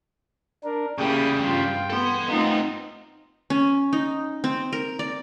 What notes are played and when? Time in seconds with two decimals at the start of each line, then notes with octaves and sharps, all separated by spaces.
0.64 D4 A#4
0.98 C#3 G3 A#3 E4 G4 G#4 G5 D#6
1.38 G2 F4 G5
1.90 B3 A4 C6
2.28 A3 B3 C4 D#4 F4
3.50 C#4
3.93 D#4
4.44 C4
4.73 A#4
4.99 D5